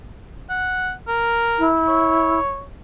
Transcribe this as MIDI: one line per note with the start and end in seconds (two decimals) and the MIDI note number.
0.50 0.91 78
1.08 1.68 70
1.59 2.39 64
1.88 2.62 73